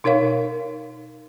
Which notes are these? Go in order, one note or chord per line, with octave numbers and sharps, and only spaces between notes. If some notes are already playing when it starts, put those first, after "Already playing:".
B2 D#4 A#4 C#5 F5